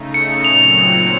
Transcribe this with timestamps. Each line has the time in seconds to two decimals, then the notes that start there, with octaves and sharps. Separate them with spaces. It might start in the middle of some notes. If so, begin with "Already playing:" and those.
Already playing: C#3 A3 D#4
0.14 C#7
0.44 A#2 F#3 C4 F7